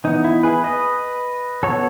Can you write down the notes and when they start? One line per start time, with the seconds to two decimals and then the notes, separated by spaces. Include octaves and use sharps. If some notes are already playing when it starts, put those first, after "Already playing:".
0.04 E3 B3 D#4
0.24 E4
0.43 G#4 B4
0.64 B4 D#5
1.63 F#3 B3 A4 C#5